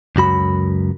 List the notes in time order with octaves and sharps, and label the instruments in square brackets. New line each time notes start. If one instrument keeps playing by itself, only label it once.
[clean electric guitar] C#2 F#2 F#4 B5